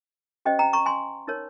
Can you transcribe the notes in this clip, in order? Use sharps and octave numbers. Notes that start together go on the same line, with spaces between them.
C#4 G4 C5 D#5 G5
G5 A#5
A#5 C#6
G#5 C6
D#4 A#4 C#5